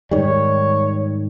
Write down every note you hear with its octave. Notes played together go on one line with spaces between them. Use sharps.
G#2 D#3 G3 C#5